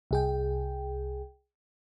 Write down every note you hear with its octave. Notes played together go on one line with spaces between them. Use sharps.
C2 G#4 G5